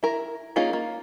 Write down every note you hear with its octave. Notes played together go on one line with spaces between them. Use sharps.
E4 A#4
A#3 C#4 D#4 F4 G#4
A#3